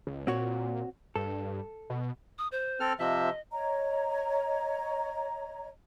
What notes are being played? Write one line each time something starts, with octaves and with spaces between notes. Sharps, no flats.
C#2
A#2 C4 F#4 C#5
G2 A4
B2
D#6
C5
C4 A4 F6
C3 F3 D#5 E5
C#5 D#5 A#5